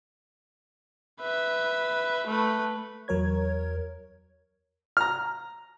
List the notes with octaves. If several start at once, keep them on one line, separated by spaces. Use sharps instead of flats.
B4 E5
A3 B4
E2 F#3 A#4 C#5 G#6
A#5 F6